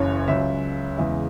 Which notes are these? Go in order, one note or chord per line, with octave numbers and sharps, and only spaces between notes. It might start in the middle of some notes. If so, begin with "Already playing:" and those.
Already playing: F#1 F#2 C#3 E3 C#5
C#2 C#3 F#3 E5
E2 C#3 G#3 E5